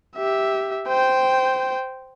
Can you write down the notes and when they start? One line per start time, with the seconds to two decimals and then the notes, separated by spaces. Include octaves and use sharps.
0.17 G4 E5
0.88 C5 G5